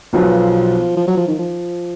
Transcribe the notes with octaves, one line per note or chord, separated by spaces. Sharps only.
B1 B2 F3 F#3 B3 F4
F3
F#3
F3
D#3
F3